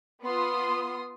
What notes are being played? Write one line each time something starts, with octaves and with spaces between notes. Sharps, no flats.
B3 F4 C6 D#6